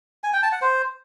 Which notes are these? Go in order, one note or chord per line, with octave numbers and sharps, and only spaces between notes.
G#5
G5
A5
F#5
C5